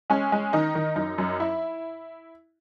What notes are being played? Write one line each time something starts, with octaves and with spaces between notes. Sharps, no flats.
G#3 C#4
G#3
D#3 D#4
D#3
F#2 D#4
F#2
E4